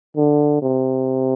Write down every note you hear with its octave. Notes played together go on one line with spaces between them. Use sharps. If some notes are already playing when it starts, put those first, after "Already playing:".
D3
C3